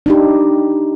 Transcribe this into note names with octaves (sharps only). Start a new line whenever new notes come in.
D4 D#4 G4